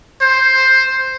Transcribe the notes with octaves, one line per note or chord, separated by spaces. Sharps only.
C5